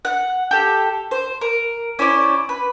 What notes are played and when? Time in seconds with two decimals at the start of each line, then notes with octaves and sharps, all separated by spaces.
0.05 F#5
0.51 G4 A4
1.11 C5
1.41 A#4
1.99 C#4 E4 C5 D5
2.49 B4